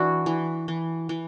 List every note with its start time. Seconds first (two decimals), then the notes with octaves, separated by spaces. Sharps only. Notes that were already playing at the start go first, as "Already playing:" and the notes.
Already playing: E3 D4 E4 F#4
0.26 E3
0.68 E3
1.09 E3